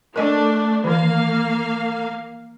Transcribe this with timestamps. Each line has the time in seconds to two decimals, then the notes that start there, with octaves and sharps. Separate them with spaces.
0.16 A3 D4 A#4 D#5
0.84 D#3 E3 A#3 F5